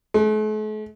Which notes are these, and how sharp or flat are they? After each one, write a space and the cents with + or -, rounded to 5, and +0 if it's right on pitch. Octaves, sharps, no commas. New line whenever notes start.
A3 -45